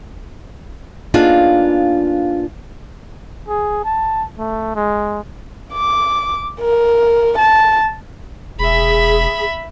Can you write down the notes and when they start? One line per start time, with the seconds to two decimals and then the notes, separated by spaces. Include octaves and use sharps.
1.14 A#3 B3 D4 D#4 F4 G#4
3.49 G#4
3.85 A5
4.38 A3
4.76 G#3
5.73 D6
6.60 A#4
7.38 A5
8.59 E1 G#4 E5 B5